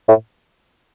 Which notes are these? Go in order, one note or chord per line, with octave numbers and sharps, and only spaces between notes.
A2